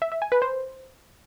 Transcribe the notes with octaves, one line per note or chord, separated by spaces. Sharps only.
E5
E5
G#5
B4
C5